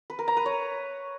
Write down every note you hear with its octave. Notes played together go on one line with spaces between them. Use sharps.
B4
A#4
A#5
B4
C#5